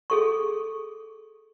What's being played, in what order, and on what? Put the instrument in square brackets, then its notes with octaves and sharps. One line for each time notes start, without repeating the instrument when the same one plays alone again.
[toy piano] G#4 A4 C#6